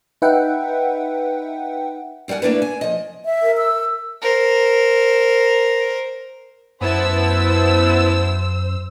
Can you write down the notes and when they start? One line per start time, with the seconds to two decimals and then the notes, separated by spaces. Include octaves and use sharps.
0.22 D#4 B4 E5 F#5 G5
2.28 D#2 G3 A#4 F#5 G#5
2.42 A3 A#3 D4 E4 B4
2.62 G#5
2.81 F3 D#5
3.25 E5
3.42 A#4
3.57 E6
4.22 A#4 C5
6.81 F#2 B3 E4 C5 A5 E6